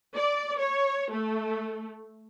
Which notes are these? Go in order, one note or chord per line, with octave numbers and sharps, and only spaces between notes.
D5
C#5
A3